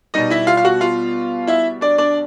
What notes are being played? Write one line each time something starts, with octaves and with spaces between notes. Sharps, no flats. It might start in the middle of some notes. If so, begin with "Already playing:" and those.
B2 G3 D#4 D#5
E4 E5
F4 F5
F5
F#4 F#5
F4 F5
E4 E5
D4 D5
D4 D5